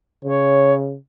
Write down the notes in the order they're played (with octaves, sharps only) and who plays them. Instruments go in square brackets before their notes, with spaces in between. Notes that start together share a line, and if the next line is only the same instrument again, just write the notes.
[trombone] C#3 [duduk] C#5